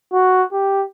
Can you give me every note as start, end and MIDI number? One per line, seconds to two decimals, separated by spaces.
0.13 0.45 66
0.53 0.85 67